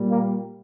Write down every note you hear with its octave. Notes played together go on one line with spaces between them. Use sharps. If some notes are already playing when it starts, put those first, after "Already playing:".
Already playing: A#2 G3
A#3